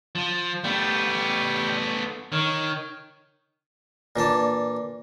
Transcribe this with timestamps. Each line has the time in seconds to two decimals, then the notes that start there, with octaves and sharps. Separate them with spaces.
0.15 F3
0.64 G3 A3 B3 G5
2.32 D#3 A#4 C#5
4.16 A#2 E3 D4 A5